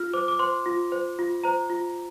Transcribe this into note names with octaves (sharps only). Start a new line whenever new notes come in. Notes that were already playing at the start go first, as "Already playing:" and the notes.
Already playing: F4 F6
C5 D6
D6
C5 C6
F4
C5
F4
C5 A#5
F4